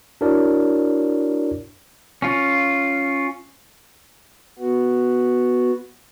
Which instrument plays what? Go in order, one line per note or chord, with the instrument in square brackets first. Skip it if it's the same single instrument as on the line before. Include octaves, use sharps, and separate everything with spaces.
[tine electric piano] D4 E4 F#4 A#4 C#5 D5
[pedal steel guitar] C#4 F4
[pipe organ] B3 F#4